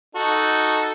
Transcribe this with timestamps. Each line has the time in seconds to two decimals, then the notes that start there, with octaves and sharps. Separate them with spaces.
0.15 D#4 F#4 A4